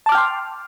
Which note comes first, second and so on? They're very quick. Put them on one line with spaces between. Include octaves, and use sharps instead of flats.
A5 D6 F6 G5 C6